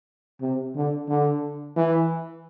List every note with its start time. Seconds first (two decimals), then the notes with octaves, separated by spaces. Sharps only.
0.41 C3
0.75 D3
1.09 D3
1.76 E3